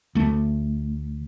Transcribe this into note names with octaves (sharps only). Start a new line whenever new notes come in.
D2 A3